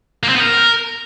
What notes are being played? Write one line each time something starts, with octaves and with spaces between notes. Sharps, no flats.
A#3
C4
B3
A#4